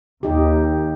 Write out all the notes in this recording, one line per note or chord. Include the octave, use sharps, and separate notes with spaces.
D#2 D#4 G4